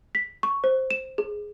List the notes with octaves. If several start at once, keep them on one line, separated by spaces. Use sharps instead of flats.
B6
C#6
C5
E7
G#4